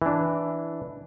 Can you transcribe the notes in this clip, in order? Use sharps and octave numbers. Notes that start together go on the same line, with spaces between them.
E3 D4